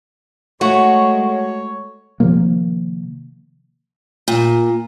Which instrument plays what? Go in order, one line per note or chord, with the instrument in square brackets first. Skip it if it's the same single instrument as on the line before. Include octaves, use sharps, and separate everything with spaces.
[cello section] G#3 [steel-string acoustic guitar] A3 [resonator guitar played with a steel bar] F#4 [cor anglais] C#5
[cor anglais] C#5
[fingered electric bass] C3 D#3 F3 A#3
[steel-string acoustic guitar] A#2